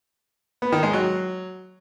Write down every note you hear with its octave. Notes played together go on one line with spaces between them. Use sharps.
B3
D#3
G#3
F#3